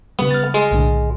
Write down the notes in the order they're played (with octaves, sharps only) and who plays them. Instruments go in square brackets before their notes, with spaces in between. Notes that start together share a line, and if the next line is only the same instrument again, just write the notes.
[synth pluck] C#3 G3 [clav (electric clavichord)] B3
[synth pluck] F6 A6
[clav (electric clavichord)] G#3
[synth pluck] B1 A2 D3